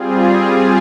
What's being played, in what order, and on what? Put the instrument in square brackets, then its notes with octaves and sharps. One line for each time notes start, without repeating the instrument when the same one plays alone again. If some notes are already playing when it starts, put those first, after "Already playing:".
Already playing: [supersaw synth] G3 C4 F4 G#4